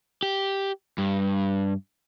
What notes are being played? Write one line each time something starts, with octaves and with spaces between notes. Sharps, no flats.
G4
G2